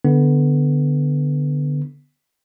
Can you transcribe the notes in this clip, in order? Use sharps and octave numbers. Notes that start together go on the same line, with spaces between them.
D3 B3